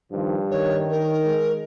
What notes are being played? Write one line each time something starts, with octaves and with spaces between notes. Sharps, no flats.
G2 D#3 F3
D#3 C#5
A#4
G#3